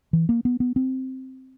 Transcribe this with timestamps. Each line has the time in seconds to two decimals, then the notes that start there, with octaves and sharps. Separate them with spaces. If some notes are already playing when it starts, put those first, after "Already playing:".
0.13 E3
0.29 A#3
0.45 B3
0.60 B3
0.76 C4